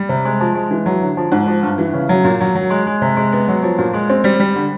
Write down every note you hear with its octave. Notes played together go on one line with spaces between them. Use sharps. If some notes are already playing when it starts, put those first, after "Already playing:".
Already playing: G3
C3
G#3
F3
G#3
E3
F#3
D3
F3
G#2
F3
G2
E3
C#3
F#3
A#2
F#3
F#3
G#3
G#3
C3
G#3
B3
F#3
F3
A#2
G#3
C4
G3
G3
D3